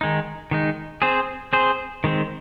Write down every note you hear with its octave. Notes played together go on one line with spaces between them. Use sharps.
D#3 G#3 D#4
D#3 G#3 D#4
C4 G#4 C5
C4 G#4 C5
D#3 G#3 C4